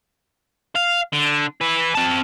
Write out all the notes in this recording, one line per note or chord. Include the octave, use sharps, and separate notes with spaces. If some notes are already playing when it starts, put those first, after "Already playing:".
F5
D3
E4 B4
C4 A5